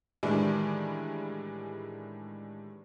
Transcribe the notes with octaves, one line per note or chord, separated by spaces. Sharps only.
A2 D#3 E3 G3 G#3 D4